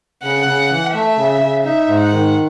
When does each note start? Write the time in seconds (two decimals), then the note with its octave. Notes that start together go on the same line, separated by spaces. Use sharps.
0.23 C#3 F#5
0.47 C#3
0.71 E3
0.93 A3 E5
1.17 C#3
1.41 C#3
1.64 D#4 E5
1.88 G#2
2.00 F#5
2.12 D#3